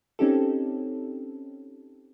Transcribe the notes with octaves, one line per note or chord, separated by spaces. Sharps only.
C4 C#4 D#4 G4 A4